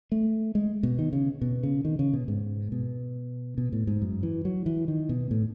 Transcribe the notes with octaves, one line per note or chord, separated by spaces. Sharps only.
A3
G#3
B2
D#3
C#3
B2
C#3
D#3
C#3
B2
G#2
B2
B2
A2
G#2
F#2
E3
F#3
E3
D#3
B2
A2